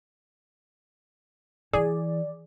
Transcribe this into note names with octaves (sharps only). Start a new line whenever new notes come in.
E3 G#4 D5